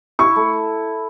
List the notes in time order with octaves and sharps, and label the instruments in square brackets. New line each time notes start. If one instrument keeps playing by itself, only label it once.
[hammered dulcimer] E4 [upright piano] C#6
[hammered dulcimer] A3